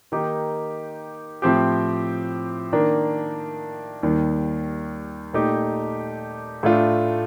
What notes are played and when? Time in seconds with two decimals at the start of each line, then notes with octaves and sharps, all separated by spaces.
0.12 D#3 A#3 D#4 G4
1.42 A2 F3 C4 G4
2.73 D#3 A#3 D4
4.03 D#2 D#3 G3
5.33 A#2 A3 D#4 G4
6.63 A2 A3 D4 F4